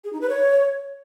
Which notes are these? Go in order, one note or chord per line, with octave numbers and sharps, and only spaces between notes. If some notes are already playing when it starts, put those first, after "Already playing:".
G#4
D#4
B4
C#5